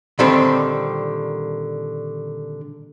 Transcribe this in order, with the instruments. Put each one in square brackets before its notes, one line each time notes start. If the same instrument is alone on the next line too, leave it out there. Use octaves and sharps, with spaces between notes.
[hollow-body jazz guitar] A#2 D3 D#3 G3 C4 A4